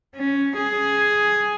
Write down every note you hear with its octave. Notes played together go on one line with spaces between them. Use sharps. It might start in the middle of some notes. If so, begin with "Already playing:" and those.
C#4
G#4